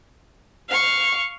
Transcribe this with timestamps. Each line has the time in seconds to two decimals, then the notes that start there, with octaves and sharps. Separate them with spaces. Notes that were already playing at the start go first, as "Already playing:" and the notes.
0.69 F5 C#6